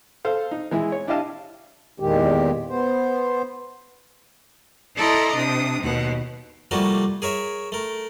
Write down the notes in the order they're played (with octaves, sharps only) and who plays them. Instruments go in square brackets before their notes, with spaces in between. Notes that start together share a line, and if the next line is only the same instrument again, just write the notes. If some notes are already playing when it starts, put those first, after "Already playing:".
[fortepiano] A4 C5 F5
D#4
E3 G#3 E4
C#5
D4 E4 G4 D#5 F5 A5
[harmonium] E2 A#2 D#3 G#3 G4
B3 C5
[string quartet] E4 A4 D5 D#5 A#5 C6
C3 D4 D#6
D#2 B2 F#5
[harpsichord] C3 F3 G3 A3 A#3 F#4
G#4 A#4 C#5 E5
A3 A#4